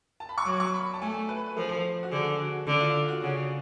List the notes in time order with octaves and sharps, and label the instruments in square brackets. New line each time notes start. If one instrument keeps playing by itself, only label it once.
[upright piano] A5
B5
C#6
[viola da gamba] F#3 [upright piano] D6
[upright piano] C#6
B5
A5
[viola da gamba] A3 [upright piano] G#5
[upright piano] B4
[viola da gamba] F3 [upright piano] A4
[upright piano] F#4
[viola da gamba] D3 [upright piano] G#4
[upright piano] F#4
[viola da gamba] D3 [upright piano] D4
[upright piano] F4
F#4
[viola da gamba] C#3 [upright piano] F#4